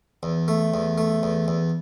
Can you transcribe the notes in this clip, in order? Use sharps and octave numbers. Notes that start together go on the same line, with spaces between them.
E2
A3
E2
A3
E2
E2